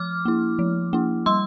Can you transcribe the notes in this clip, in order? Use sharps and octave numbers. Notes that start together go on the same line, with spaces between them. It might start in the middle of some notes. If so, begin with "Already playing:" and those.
Already playing: F3 D6 F6
A#3 E4
F3
A#3 E4
G3 C6 E6